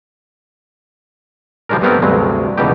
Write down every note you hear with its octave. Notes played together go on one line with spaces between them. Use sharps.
F3 G3 G#3 D4 A#4
G2 A3 B3 C4 A#4
D2 G2 C3 F#3 G#3
C#2 B2 E3 G3 D#4 G4